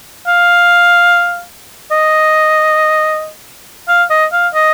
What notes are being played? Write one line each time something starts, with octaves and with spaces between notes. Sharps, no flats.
F5
D#5
F5
D#5
F5
D#5